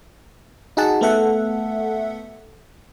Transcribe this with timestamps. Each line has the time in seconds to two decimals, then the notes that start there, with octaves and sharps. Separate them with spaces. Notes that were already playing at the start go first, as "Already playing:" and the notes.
0.77 D#4 F#4 G#4 F#5 A5
1.01 A3 B3 A4 E5 F#5